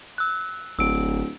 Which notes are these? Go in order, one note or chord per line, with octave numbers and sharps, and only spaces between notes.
E6 F#6
D1 G1 E6 D7